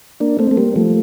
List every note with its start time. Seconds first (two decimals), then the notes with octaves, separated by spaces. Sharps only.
0.20 A#3 D4
0.39 A3 C4
0.51 A3
0.57 G3 A#3
0.76 F3 A3